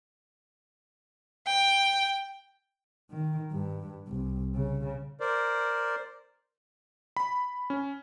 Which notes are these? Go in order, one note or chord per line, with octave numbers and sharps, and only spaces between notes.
G5
D#3
G2
C2
C#3
A#4 C5 D5
B5
C#4